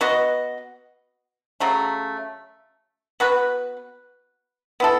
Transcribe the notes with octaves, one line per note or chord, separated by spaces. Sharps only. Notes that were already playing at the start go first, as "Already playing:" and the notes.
B3 F#4 B4 D#5
C#3 F#3 A3
B3 F#4 B4
B3 E4 A4